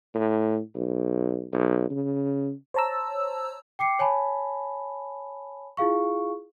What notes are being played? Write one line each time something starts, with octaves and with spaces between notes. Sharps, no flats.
A2
B1
B1
C#3
C5 C#5 A5 A#5 E6
G5 D6 C7 C#7
C#5 G#5 A5 B5
E4 F4 G#4 F5 C#6